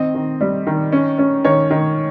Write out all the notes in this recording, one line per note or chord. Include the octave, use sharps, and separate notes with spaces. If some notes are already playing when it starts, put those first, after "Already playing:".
Already playing: D#3 C4 D#5
D#3
G3
D#3
C#4
C#4
D#3 C#5
D#3